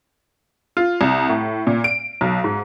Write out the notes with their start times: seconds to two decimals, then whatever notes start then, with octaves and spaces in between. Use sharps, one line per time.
0.77 F4
1.01 C2
1.29 A2
1.67 A#2
1.84 D7
2.21 B1
2.44 G#2